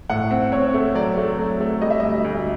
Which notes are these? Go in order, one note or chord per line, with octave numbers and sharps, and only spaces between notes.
A2 F#5
C4
C4 C#5
A3
F#3 D5
A3
F#3
A3
G3 D#5
E5
D2 D#5
D2